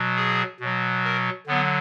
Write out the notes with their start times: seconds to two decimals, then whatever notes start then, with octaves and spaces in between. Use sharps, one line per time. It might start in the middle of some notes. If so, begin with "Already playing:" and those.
Already playing: B2 F#3
0.16 G#4
0.60 B2 F#3
1.04 A#4
1.47 D3 F#3 B3